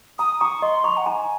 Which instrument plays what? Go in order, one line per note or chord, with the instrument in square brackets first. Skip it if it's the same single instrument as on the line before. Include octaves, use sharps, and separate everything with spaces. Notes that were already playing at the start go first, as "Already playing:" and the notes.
[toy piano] A#5 [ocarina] D#6
[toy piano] A#5 [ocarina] C#6
[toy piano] D#5 [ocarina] C6
[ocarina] A#5 [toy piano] C#6
[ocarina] F#5
[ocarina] G#5 [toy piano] A#5